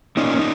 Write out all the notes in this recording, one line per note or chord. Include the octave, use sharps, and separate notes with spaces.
A#3 C#4 D#4
D#4